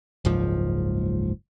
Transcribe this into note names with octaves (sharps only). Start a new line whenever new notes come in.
F#1 C#2 G#2 F3